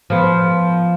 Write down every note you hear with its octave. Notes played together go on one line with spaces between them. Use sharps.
F3 B3